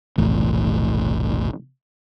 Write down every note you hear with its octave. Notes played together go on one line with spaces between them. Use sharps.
F1 B1 A2 E3